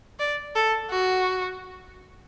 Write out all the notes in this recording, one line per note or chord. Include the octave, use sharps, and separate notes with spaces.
D5
A4
F#4